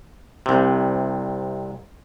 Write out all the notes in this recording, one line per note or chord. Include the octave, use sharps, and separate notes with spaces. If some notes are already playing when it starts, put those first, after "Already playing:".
C2 C3